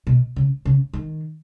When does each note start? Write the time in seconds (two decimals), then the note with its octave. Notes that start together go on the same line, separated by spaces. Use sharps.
0.07 B2
0.36 C#3
0.65 C#3
0.93 D#3